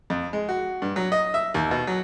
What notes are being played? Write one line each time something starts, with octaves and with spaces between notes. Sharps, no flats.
F2
G#3
F#4
G2
F#3
D#5
E5
D#2
B2
F#3